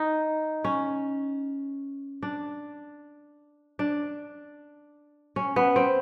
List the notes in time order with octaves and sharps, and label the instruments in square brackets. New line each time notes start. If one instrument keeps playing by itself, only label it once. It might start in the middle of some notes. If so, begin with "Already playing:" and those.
Already playing: [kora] D#4
C#4
D4
D4
C#4
B3
C4